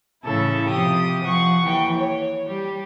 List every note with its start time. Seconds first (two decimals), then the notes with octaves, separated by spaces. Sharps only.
0.23 A2 C#3 E3 E4 A4 E5
0.68 C3 F3 G4 D#6
1.23 F3 F#5 C#6
1.64 D#2 E3 G5
1.96 C#5
2.47 G3 G4